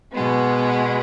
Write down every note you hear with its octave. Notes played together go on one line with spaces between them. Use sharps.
B2 G#3 B3